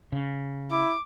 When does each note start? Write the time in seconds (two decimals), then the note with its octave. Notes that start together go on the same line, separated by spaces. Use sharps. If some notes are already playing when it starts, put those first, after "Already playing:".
0.12 C#3
0.71 E4 D6